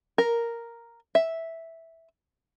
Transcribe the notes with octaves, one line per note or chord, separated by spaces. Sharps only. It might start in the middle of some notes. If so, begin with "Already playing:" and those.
A#4
E5